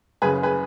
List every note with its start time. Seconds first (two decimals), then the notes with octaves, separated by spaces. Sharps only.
0.22 F#1 F#2 C#3 G#4 B4
0.43 G#4 B4